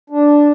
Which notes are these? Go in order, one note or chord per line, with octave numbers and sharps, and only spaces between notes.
D4